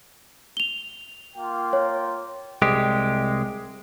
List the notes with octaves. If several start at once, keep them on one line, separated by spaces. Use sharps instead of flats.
F7 G7
A#3 F4 G5
C#5
C2 G#3 G4